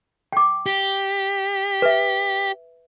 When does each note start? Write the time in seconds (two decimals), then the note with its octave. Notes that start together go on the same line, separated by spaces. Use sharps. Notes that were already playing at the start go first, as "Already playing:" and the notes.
0.33 G5 D6
0.66 G4
1.82 B4 E5